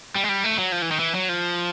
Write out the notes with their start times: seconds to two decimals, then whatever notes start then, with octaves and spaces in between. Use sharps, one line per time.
0.15 G3
0.24 G#3
0.29 G3
0.44 A3
0.58 F#3
0.72 F3
0.82 E3
0.91 D#3
0.99 E3
1.15 F#3
1.29 F3